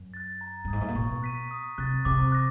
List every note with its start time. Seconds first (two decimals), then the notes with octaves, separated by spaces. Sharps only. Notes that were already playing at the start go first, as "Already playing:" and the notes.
Already playing: F#2
0.14 F#6 A6
0.41 A#5
0.65 G2
0.68 G#2 D#6 G#6
0.81 A2
0.88 A#2
0.95 B2 C#6
1.23 F#6 B6 D#7
1.51 D#6
1.78 C3 F#6 A6
2.05 C3 D6
2.32 F#6 A#6